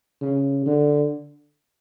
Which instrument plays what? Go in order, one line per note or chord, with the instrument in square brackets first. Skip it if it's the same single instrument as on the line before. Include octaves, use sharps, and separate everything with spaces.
[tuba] C#3
D3